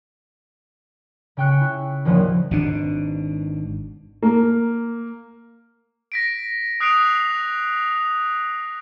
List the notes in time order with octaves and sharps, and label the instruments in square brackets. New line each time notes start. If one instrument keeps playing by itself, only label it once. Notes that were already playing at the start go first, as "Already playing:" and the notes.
[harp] C#3 C#4 G5 C#6 F#6 C#7
E4
A#1 D#2 F3 F#3
[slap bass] G#1 B2 D4
[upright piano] A#3
[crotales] A#6 B6 D7
D#6 F#6 C7 D7 F7